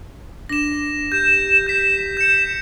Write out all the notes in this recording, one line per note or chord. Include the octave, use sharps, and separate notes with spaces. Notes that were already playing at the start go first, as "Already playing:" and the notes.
D4 A#6 E7
G4 G6 E7
G6 B6 E7
G6 C#7 E7